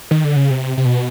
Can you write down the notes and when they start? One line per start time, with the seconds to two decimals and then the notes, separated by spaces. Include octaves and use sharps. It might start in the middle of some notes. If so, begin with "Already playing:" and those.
0.11 D#3
0.24 D3
0.36 C#3
0.51 C3
0.77 C3
0.85 B2